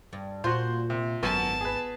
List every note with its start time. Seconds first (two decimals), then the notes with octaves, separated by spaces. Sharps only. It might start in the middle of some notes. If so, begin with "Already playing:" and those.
0.13 G2
0.44 A#2 F4 F#4 C5
0.90 C3
1.23 G#1 F#2 B3 A5
1.61 G#4 B4